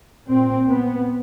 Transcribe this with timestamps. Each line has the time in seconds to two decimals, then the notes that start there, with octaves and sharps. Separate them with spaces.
0.28 A#2 C4
0.69 B3